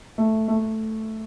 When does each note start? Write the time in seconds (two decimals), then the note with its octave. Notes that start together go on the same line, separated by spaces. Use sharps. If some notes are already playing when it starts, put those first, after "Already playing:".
0.18 A3
0.48 A3